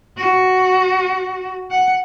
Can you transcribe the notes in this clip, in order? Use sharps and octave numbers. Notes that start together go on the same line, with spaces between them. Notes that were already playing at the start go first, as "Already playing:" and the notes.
F#4
F#5